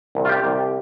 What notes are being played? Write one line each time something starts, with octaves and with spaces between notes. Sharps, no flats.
C2
F4
G4
C2